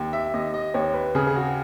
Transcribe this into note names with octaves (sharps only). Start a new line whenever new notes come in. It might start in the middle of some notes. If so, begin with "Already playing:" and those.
Already playing: D#2
E5
D#2 D#5
D#5
D#2 C#5
B4
C#3 G#4
G#4
F#4